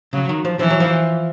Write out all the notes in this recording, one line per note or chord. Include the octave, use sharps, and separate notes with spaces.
C#3 F#3
D#3
F3
E3 F3
F#3
F3